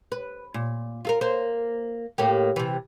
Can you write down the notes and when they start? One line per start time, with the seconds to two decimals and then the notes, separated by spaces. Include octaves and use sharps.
0.12 B4
0.54 A#2
1.05 F4 A4 A#4
1.21 A#3 C5
2.18 A2 A#3 G4
2.56 C3 E3